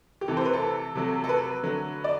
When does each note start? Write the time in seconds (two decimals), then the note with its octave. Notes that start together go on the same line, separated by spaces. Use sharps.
0.21 G4
0.28 C3 E3 A3 A4
0.37 C5
0.45 B4
0.54 A4
0.95 C3 F#3 A3
1.24 A4
1.29 B4
1.63 D3 F#3 A3
2.04 D5